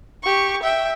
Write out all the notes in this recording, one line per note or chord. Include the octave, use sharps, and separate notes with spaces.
G4 C#6
E5 G5